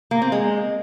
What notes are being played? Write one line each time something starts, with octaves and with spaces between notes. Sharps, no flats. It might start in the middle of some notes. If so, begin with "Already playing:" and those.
A#3
C4
G#3